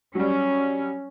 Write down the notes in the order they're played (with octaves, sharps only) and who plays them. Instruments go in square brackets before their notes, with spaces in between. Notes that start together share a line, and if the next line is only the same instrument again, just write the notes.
[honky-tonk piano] F#3 G3 [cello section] C#4